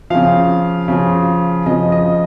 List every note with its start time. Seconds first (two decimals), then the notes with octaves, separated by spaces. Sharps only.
0.10 C#3 F3 F5
0.88 C#3 F3
1.66 C#3 F3 D#5
1.92 D#5